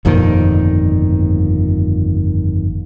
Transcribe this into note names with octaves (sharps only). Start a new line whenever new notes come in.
G1 F2 A#2 D#3